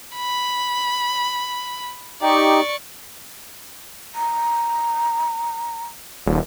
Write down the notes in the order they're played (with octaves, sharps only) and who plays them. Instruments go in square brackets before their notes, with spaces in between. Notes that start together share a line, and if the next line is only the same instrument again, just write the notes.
[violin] B5
[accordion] D#4 G4 [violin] D5 C#6
[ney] A#5
[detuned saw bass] D#1